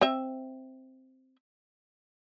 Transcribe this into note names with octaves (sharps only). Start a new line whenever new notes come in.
C4 E5